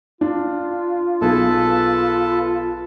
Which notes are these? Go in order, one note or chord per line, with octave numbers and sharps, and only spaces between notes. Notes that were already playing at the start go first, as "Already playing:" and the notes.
D4 F4
B1 G#4 A4 B4 A5